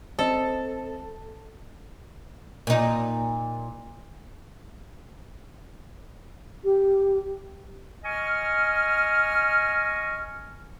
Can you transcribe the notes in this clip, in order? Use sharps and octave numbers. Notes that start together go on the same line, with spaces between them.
C4 A4 D#5
A#2 D#4
G4
D#5 G#5 C#6 F6